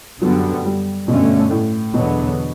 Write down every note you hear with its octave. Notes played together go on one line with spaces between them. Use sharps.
F#2 D3 F#3 G3 B3
G3
G2 B2 D3 A3 C#4
A2
E2 B2 D3 F#3 B3